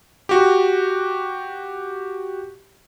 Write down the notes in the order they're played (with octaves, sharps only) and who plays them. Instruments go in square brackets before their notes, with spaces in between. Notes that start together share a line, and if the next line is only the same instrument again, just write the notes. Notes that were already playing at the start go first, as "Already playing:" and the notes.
[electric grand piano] F#4 G4